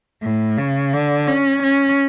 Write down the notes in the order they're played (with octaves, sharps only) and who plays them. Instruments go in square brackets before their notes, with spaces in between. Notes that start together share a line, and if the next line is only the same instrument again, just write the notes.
[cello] A2
C#3
D3
C#4
C#4